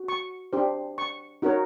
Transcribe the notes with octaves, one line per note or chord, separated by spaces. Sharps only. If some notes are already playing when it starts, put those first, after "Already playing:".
Already playing: F#4
C#6
D4 G4 C5
C#6
D#4 F#4 A#4 C#5